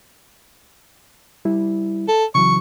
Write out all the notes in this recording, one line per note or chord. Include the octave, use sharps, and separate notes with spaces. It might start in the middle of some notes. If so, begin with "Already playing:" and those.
G3 E4
A4
C#3 E3 F#3 C#6